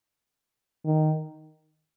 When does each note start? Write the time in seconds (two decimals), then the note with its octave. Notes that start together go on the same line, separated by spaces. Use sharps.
0.85 D#3